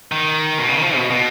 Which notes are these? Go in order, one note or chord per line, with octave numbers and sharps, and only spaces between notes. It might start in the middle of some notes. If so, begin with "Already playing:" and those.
D#3
B2
C#3
D#3
F3
B2
B2